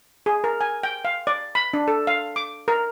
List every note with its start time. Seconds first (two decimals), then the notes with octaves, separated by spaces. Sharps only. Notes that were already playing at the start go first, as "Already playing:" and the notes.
0.26 G#4
0.44 A#4
0.61 G#5
0.83 G5
1.05 F5
1.27 D5
1.55 B5
1.74 D4
1.88 A4
2.07 F5
2.36 D6
2.68 A#4